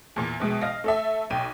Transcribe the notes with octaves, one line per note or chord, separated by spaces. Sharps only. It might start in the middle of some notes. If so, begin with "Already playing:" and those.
E2 A#2
A#1 B2 G#3
D#5 F5 A#6
A3 A4 E5
B1 G5 D#7